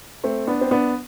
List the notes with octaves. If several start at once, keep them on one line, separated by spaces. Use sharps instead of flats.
A3 C4
B3 D4
C4
B3 D4